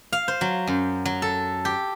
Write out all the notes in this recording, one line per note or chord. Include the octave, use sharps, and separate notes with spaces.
F5
C5
F#3
F#2
F#3
A4
G4